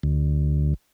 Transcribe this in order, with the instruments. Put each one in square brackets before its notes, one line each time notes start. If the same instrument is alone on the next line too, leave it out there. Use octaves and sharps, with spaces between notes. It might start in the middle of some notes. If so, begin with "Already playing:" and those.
[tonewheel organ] D2